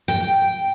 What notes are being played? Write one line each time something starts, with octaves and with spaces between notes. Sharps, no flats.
G5